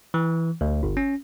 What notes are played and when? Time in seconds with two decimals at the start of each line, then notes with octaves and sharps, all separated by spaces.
0.14 E3
0.61 D2
0.83 G1
0.97 C#4